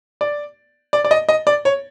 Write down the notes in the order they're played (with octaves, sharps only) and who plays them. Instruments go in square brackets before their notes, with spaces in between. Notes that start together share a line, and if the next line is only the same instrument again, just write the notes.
[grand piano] D5
D5
D5
D#5
D#5
D5
C#5